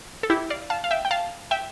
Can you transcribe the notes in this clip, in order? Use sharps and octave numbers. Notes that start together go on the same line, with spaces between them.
A4
E4 G4
D5 F5
F5 A5
F5
E5 G5
G5
F5 A5
E5 G5